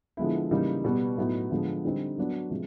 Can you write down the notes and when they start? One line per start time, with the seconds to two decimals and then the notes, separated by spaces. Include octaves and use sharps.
0.17 D3 F3 G#3 B3 E4
0.51 C#3 E3 G3 A#3 D#4
0.84 B2 G3 B3
1.18 A2 F#3 B3 D#4 F#4
1.50 D3 F3 G#3 B3
1.85 D3 G3 C4 D#4
2.18 F#3 B3 D4 F#4
2.51 C3 F3 G#3 B3